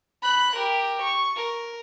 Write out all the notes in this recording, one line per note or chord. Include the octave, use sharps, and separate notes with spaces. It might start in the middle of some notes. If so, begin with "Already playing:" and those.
B5 F#6
G4 A#4
C#6
A#4